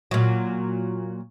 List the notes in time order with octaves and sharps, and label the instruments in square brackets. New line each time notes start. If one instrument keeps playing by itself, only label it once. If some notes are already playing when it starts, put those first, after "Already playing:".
[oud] A#2 F#3